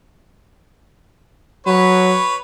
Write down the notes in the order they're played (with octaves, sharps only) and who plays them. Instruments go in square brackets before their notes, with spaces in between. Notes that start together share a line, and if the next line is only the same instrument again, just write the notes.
[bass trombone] F#3 [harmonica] B4 C#5